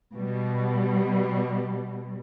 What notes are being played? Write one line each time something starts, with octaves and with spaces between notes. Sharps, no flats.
B2 G3